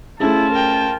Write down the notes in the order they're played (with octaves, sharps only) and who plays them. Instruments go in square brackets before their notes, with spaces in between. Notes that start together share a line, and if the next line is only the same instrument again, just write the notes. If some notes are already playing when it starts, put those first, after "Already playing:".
[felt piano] A3 C#4 G#4 [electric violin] E4 [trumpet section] F4 C5 A5
[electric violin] A#4 G5